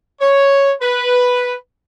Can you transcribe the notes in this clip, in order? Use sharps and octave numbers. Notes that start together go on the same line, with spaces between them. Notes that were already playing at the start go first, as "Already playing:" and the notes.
C#5
B4